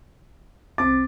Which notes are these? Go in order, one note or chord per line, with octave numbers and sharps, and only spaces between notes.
C2 C4 D6 A6